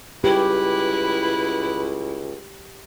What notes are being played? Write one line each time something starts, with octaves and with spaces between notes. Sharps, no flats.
C#2 E4 G4 B4